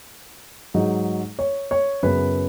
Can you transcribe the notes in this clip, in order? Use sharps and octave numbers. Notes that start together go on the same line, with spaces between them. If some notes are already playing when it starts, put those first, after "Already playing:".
G#2 F#3 D#4
C#5
C#5
F#2 C#3 B3 B4